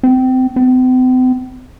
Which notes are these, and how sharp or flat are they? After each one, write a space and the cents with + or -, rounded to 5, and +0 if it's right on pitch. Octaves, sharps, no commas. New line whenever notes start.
C4 -25
C4 -45